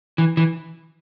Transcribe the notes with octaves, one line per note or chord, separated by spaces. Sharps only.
E3
E3